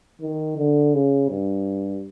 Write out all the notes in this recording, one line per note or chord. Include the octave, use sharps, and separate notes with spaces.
D#3
D3
C#3
G2